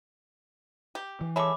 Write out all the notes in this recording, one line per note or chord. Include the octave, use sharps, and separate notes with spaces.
G4
E3
G#3 A4 C#5 E5 B5 D6